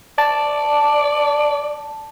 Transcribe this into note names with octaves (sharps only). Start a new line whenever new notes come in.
D5 A5